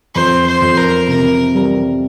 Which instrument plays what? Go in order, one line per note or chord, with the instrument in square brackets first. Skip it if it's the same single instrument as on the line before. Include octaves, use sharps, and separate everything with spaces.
[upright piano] F2 [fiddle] C5
[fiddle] C5
[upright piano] F2
[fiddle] A#4
[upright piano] C3 [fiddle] A#4
[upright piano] G3